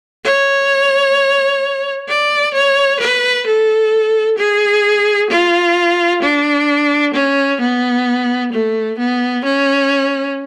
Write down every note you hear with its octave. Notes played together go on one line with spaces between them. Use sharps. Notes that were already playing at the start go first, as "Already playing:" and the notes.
C#5
D5
C#5
B4
A4
G#4
F4
D4
C#4
B3
A3
B3
C#4